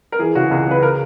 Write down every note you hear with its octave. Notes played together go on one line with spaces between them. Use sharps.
A#4
E3 G#4
C#3 F#4
C#2 G#4
C#3 B4
A#4